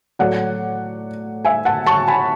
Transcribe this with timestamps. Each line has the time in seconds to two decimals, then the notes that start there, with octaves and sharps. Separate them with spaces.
0.19 A2 F#3 A3 D5 F#5
1.45 E5 G#5
1.65 F#5 A5
1.86 A5 C#6
2.08 G#5 B5